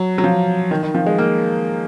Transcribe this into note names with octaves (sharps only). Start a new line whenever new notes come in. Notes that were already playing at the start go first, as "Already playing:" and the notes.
Already playing: F#3
F#3
F3
D#3
D#3
F3
G#3
A#3